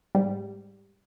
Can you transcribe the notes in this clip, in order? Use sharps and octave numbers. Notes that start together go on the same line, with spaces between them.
G#2 G3